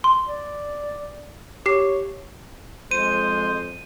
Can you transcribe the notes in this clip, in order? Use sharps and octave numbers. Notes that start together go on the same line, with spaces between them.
C6
D5
G4 C#5 C7
F2 G#3 C5 D#7